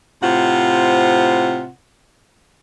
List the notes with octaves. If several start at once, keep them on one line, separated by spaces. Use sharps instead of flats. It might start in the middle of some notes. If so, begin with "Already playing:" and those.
A2 C3 F4 C5 F#5